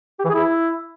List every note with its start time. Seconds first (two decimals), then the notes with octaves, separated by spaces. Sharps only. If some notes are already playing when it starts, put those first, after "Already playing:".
0.19 G4
0.24 E3
0.30 G#4
0.35 E4